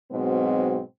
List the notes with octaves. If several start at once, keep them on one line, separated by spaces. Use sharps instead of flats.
G#2 B2 F#3 C4